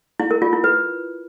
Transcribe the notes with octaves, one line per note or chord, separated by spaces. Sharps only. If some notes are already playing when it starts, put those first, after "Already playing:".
E4
A#4
F4
E4
B4